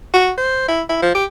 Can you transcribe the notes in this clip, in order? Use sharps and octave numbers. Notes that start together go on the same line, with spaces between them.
F#4
C5
E4
E4
F3
G4